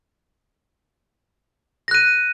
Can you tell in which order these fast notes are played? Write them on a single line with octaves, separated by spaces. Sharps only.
A#6 F#6 D#7